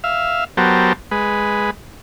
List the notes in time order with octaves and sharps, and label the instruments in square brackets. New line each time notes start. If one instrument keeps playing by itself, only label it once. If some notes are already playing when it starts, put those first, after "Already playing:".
[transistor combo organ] E5 F5
F#3 B3 G4 A#4 C5 A5
G#3 B4